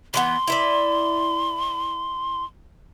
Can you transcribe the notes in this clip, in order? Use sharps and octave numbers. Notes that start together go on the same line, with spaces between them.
E3 G#3 B3 C6
E4 B4 D5